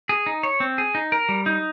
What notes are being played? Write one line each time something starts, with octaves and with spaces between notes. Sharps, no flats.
G#4
D#4
C#5
C4
G#4
D#4
A#4
G3
D#4